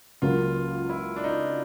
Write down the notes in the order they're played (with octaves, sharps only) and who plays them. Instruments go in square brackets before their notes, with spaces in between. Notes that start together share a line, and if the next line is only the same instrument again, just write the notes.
[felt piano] C#2 C#3 F#3 A#3 [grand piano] F4
[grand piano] E4
D4
D#4